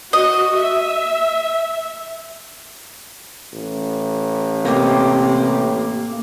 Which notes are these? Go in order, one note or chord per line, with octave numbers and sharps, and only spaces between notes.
F#4 D#5
E5
A1
C3 A#3 G4